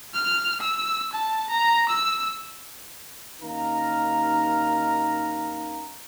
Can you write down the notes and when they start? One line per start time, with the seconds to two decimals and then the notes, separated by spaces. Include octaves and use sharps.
0.14 F6
0.61 E6
1.13 A5
1.50 A#5
1.89 E6
3.42 D#2 C#4 D#4 A#4 F5 A#5